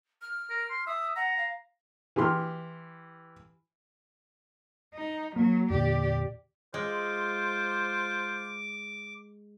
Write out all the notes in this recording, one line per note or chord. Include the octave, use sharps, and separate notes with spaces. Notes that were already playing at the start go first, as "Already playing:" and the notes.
F6
A#4
C6
E5 D#6
F#5 A#5
F5
E3 G4 C6 F6
D#4
F#3 A#3
E2 A#2 D3 G4 D5
G#3 F4 C5 D6